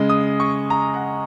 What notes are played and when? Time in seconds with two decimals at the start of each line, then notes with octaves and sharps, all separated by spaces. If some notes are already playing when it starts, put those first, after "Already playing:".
Already playing: C#3 G#3
0.09 D#6
0.40 C#6
0.70 A#5
0.94 F#5